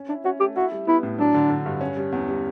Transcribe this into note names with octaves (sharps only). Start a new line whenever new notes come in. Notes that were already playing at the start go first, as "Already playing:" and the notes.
Already playing: C#4
D4 E4
C#4 F#4
A3 G4
E4 F#4
G3
B3 E4
A2
F#3 D4
D3
D3
G2
C#4
G3
E2
G3